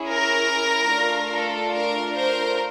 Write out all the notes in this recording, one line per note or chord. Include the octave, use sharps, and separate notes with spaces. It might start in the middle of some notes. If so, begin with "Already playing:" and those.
Already playing: C#4 E4 G#4
A#4
A3 D4 F4
A4
A#4
A#4 C5